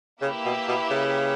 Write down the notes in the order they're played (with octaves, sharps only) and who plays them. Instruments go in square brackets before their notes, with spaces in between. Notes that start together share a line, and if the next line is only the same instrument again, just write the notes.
[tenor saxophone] C#3 [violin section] A#3 E4 G4 B4 E5
[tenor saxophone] B2
B2
C#3